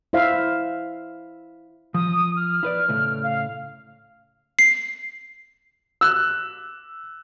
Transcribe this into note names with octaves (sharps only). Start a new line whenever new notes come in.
E4 C5 E5 F5
F3 D#6
F6
E4 B4 D5
A2 C#3 A3
F5
C7
E6 F#6